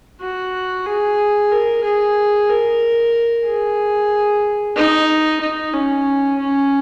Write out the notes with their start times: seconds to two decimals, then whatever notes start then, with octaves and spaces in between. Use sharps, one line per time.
0.21 F#4
0.86 G#4
1.52 A#4
1.84 G#4
2.49 A#4
3.46 G#4
4.76 D#4
5.40 D#4
5.74 C#4
6.39 C#4